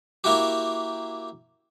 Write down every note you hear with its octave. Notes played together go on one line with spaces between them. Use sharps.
A#3 E4 F#4 G4